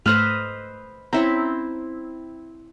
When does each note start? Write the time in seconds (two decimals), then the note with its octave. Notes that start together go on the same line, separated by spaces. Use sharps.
0.06 G#2 A3 B4 C5 D#5 E6 F6
1.13 C4 C#4 E4 E5 A#5